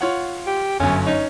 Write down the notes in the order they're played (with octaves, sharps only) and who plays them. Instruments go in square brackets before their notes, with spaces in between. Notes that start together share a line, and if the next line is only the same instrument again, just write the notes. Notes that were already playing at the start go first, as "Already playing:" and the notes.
[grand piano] F4 C#5 F#5
[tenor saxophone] G4
[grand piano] G1 F#2 [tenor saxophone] C#4
[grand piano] C#4 [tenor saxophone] D#4